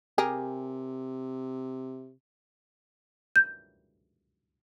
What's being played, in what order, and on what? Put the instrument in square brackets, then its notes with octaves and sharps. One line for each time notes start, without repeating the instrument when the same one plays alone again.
[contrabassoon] C3 [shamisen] G4 G#4 A#4
[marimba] G6